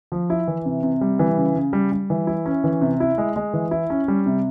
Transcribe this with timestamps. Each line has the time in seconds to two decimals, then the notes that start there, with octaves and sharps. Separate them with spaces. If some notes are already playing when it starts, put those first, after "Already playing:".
0.12 F3
0.30 E4
0.48 E3
0.66 C3
0.83 C3
1.01 G3
1.19 E3
1.37 C#3
1.56 C#3
1.73 G3
1.92 G3
2.10 E3
2.27 E4
2.46 C#4
2.64 E3
2.81 C3
3.00 E4
3.18 G#3
3.36 G#3
3.53 E3
3.71 E4
3.90 C#4
4.08 G3
4.26 C3